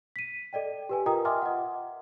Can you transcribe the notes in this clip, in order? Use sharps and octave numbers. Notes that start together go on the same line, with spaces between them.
B6 D#7
A4 D5 D#5 G5
G4 B4 G#5
F4 A#4 D#5 G5 A#5 D#6
D#5 E5 G#5 C6 D6 F6
D#5 F#5